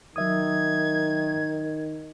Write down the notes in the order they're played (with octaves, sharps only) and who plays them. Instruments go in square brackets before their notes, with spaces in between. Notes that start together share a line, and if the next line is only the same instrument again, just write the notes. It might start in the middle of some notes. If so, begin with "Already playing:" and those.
[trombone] D#3 [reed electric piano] F#3 E5 D#6 [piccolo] G#6